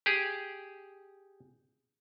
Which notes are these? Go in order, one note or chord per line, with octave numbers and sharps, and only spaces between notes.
G4 G#4